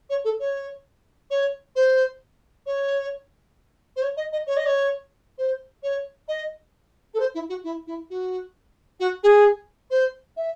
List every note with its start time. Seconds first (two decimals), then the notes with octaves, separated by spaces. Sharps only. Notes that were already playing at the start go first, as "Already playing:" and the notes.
0.09 C#5
0.24 A4
0.39 C#5
1.30 C#5
1.75 C5
2.66 C#5
3.96 C5
4.02 C#5
4.16 D#5
4.32 D#5
4.46 C#5
4.56 D#5
4.66 C#5
5.38 C5
5.83 C#5
6.28 D#5
7.14 A4
7.19 C5
7.34 E4
7.49 F#4
7.64 E4
7.87 E4
8.10 F#4
8.99 F#4
9.23 G#4
9.90 C5
10.36 E5